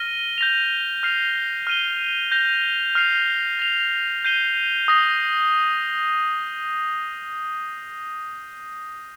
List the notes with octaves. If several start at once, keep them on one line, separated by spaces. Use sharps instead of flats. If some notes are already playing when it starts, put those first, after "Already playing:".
Already playing: F6 A#6 D#7 G7
G6 A#6 F7
F6 C7 F7
F6 D#7 G7
G6 A#6 F7
F6 C7 F7
A#6 F7
G6 C7 D#7 G7
D#6 A#6 G7